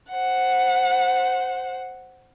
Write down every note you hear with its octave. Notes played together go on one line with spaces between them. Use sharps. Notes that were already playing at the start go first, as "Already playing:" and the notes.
C5 F#5